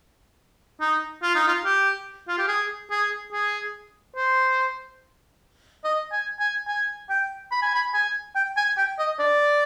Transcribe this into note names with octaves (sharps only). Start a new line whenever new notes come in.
D#4
F4
D#4
F4
G4
F4
G4
G#4
G#4
G#4
C5
D#5
G#5
G#5
G#5
G5
B5
G#5
B5
G#5
G5
G#5
G5
D#5
D5